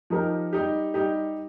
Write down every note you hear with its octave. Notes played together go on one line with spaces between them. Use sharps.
F3 D#4 G4 A#4
G3 D#4 G4
G3 D#4 G4